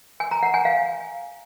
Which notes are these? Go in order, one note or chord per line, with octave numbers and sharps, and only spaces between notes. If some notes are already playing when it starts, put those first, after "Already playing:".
G#5
A#5
F#5
G#5
F5